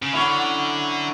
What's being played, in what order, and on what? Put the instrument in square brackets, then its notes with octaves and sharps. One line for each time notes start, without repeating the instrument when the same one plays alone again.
[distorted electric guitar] C#3
[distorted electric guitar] D3 [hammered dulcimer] F#3 C#4 E4